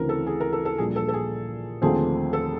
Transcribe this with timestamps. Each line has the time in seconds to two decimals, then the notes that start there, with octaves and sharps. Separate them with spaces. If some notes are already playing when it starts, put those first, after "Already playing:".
Already playing: D2 C#3 E3 A3 C4 A#4
0.09 A4
0.27 G#4
0.40 A#4
0.52 A4
0.65 A4
0.78 A#1 A#2 G3 G#4
0.96 A4
1.08 A4
1.13 G#4
1.82 D#2 D3 F3 A3 C4 G#4
2.33 A4